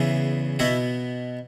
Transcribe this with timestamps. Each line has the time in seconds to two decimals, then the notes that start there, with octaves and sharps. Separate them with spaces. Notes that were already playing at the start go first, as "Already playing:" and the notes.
Already playing: E2 C#3 E3 B3
0.59 B2 B3 E4 F#4